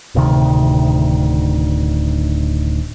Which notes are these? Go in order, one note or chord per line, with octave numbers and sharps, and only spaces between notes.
D1 D2 C3 D#3